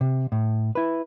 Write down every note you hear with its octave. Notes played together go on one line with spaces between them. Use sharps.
C3
A2
E4 B4